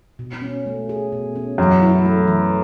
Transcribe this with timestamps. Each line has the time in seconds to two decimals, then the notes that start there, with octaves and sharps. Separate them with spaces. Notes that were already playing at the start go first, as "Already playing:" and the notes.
0.19 B2
0.42 C#4
0.66 A3
0.89 G#4
1.12 B2
1.36 C#4
1.58 F#2 E3
1.82 E4
2.05 A3
2.27 E3